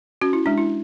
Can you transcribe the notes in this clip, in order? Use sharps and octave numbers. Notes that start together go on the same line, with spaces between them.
C#4 F#4
E4
G#3 D4
E4